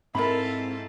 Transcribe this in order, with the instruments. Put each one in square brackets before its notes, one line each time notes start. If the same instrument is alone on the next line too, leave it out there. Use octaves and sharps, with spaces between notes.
[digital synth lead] G#2 [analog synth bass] C4 [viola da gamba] E4 F4 A4 [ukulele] A#4 B5